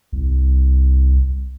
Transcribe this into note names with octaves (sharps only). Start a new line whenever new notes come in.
C2